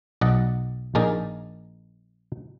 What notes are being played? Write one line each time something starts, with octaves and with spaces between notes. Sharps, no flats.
B1 D5 D#5 F#5
A#1 D#4 G#4 A#4 D5